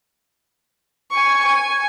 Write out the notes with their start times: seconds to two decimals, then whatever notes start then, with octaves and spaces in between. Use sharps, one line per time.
1.11 G#5 C#6
1.46 G#5